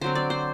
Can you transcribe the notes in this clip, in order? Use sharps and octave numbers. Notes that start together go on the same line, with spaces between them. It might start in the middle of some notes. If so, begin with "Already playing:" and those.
D3 F#3 C4 C5
D5
C5